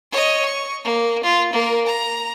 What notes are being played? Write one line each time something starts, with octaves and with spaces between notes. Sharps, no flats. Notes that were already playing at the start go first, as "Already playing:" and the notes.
C#5 D#5
C#6
A#3
F4
A#3 A#4
A#5